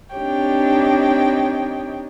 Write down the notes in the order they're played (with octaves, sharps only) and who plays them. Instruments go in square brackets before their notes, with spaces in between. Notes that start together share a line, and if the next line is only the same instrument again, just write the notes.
[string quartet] C4 D4 D#4 G4 C#5 G5